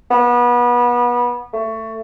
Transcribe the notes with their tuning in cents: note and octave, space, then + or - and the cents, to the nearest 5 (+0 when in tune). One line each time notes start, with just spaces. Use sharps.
B3 -25
A3 +20